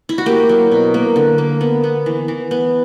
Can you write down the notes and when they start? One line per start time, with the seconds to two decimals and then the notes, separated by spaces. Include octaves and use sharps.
0.09 E4
0.18 F#4
0.26 A#3 G4
0.49 F#3
0.71 B2
0.94 A#3
1.16 D3
1.38 A#3
1.61 B3
1.84 B3
2.06 E3
2.28 E3
2.51 B3